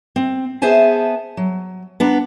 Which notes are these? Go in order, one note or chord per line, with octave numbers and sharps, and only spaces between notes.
C4
B3 G#4 C5 E5 G#5 A5
F#3
B3 D4 A#5